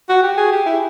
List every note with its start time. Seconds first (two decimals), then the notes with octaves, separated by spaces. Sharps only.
0.09 F#4
0.23 G4
0.37 G#4
0.52 G4
0.66 E4